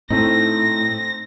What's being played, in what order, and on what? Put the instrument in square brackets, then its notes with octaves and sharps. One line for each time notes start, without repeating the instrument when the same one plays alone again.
[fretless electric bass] A2 [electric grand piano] A3 C4 D#4 [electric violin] A#6